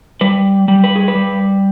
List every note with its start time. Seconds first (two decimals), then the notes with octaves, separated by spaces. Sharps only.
0.21 G3 B4
0.68 G3
0.84 B4
0.96 G#4
1.08 B4
1.15 G3